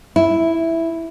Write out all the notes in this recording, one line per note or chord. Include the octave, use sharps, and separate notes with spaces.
E4